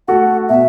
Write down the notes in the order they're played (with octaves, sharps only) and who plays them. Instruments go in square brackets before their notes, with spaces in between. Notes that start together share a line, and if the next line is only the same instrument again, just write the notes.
[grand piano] A3 F#4 A4 [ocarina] F#5
[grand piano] B2 [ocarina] E5